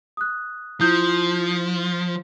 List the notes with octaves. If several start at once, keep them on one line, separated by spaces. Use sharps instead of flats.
D#6 F#6
F3 E4 D#6 G6